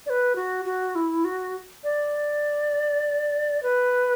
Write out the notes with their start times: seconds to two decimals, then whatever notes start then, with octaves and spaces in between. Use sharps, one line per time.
0.06 D5
0.10 B4
0.35 F#4
0.65 F#4
0.95 E4
1.25 F#4
1.84 D5
3.63 B4